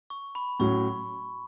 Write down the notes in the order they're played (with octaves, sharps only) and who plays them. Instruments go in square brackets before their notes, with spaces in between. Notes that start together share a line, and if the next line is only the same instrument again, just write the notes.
[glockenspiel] C#6
B5
[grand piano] A2 F#3 C#4 [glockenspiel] C#6